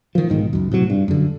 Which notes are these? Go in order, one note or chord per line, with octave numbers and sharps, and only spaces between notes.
D#3 F3
B1 G#2 D#3
C#2 F#2
A2 C3 F#3
G2
F#2 D3